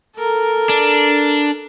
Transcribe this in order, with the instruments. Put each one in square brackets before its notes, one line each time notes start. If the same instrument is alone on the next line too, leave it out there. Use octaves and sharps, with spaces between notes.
[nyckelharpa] A4 A#4
[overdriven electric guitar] D4